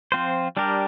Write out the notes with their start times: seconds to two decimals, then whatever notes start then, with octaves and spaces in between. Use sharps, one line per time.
0.12 F3 C4 F4 C5
0.57 G3 D4 G4 A#4